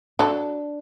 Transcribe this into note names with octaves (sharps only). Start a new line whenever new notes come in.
F#3 D4 A4